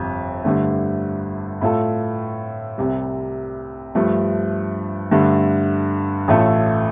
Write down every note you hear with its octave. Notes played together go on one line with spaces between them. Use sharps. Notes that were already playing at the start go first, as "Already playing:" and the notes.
Already playing: G1 F2 C3
G2 D3 A3
A2 A3 F4 A4
C2 C3 G3
G2 F3 A3
G2 D3 A3
A1 A2 A3 F4 A4